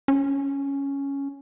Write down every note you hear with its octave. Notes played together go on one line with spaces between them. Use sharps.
C#4